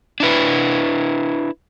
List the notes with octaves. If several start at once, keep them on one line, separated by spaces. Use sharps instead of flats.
D4 E4 B4